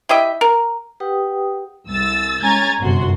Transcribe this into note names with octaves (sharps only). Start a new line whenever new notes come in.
E4 G4 D#5 E5
A#4
G4 B4 F#5 G5 D#6
C2 E6 A6
G#3 C#4 G#5 A#5 G#6 A6
G1 F#2 C3 F#4 C6